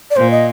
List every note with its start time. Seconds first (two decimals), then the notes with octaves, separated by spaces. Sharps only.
0.11 D5
0.16 A#2 C5
0.31 D#5